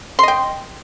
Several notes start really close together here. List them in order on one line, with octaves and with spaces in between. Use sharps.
C6 D#5 G5